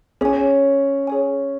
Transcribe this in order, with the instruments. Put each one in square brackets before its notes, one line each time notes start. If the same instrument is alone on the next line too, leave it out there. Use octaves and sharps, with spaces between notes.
[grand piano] C#4 [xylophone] G#4 C#5 G#5
[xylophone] G#4 C#5 G#5